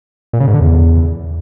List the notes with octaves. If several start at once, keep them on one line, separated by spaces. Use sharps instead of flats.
A#2
C#3
G#2
D3
E2